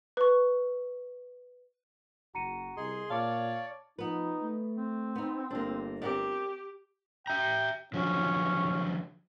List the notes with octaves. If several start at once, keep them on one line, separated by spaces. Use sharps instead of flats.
B4 C#6
F#1 F#4 A#5 C#7 D#7
C2 G#4 D#5 C6
A#2 C#5 D5 F5 A5 D6
F3 B3 D#4 B4
A3
C4
B3 D#4
G1 A#3 D4
C4 G4 A#4 D5
E5 G5 A#5
D3 F3 F#3 C#4